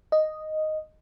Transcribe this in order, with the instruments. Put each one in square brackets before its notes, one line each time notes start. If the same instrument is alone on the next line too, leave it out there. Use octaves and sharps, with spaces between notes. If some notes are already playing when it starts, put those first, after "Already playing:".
[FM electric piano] D#5